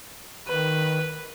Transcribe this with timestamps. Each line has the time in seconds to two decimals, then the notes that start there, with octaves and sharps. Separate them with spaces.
0.47 D#3 B4